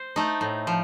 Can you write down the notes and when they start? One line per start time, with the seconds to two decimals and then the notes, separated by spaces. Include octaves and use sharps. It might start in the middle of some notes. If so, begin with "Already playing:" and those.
Already playing: C5
0.16 A3 D#4
0.41 A2
0.67 F3